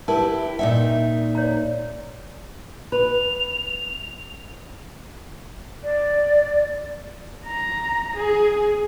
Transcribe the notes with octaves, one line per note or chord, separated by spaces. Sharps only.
E4 G4 A#4 B4 A5
A#2 D#4 E5 G5
C#5 D5 A#5
B4 F7
D5
A#5
G#4